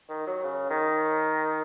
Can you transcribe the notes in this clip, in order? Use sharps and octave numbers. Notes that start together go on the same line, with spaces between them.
D#3
F#3
C#3
D#3